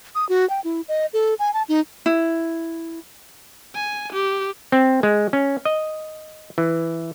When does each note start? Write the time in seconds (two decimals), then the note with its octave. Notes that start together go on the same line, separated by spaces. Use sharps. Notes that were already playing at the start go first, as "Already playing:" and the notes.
0.15 D#6
0.29 F#4
0.50 G5
0.64 E4
0.88 D#5
1.13 A4
1.39 G#5
1.54 A5
1.69 D#4
2.06 E4
3.75 G#5
4.12 G4
4.72 C4
5.03 G#3
5.33 C#4
5.65 D#5
6.58 E3